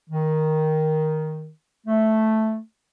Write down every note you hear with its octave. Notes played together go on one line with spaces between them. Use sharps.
D#3
A3